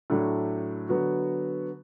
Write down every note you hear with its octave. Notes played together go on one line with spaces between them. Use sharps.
A2 F#3 A3 D4
D3 F#3 B3 F#4